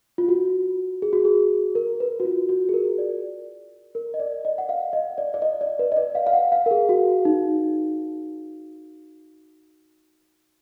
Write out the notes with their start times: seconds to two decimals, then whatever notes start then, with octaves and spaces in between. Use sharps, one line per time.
0.18 F4
0.28 F#4
1.02 G#4
1.13 F#4
1.25 G#4
1.75 A#4
2.00 B4
2.20 F#4
2.25 F4
2.49 F#4
2.69 G#4
2.74 A#4
2.98 D5
3.95 A#4
4.14 D#5
4.20 D5
4.45 D#5
4.58 F#5
4.69 F5
4.93 D#5
5.18 D5
5.34 D5
5.42 D#5
5.61 D5
5.79 B4
5.92 D#5
5.97 D5
6.15 F5
6.27 F5
6.33 F#5
6.52 F5
6.66 A#4
6.71 G#4
6.89 F#4
7.25 D#4